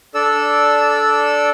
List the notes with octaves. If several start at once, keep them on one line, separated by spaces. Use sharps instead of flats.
D4 A4 D5 E6